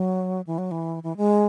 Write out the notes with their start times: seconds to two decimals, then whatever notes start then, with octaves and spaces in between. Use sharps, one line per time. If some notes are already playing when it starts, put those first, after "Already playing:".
Already playing: F#3
0.47 E3
0.58 F#3
0.71 E3
1.03 E3
1.17 G#3